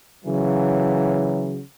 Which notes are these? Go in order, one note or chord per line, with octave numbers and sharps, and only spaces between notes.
C#3 E3 F#3